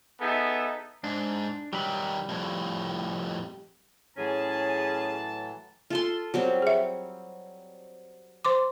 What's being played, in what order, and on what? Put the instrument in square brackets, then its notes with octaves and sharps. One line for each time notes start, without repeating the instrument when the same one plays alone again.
[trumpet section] B3 D#4 G#4 A4 E5
[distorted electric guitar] G#2 [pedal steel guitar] D4
[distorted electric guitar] D#3 F#3 [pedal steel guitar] G3 B5
[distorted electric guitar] F2 A2
[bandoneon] A2 E3 F#3 [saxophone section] C#4 G#4 [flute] C#5 [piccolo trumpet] A5
[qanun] F4 A4 C6
F#3 G3 C4
[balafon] G#4 E5
C5 C6 D6